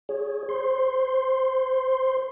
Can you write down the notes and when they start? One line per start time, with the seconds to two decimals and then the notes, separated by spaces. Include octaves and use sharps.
0.09 G#4 C#5
0.49 C5 C6